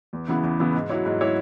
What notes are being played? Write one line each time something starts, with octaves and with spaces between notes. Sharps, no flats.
E2
C#3 E3 B3 E4
E2
C#3 E3 B3 E4
G#2
F#3 E4 C#5
G#2
F#3 E4 C#5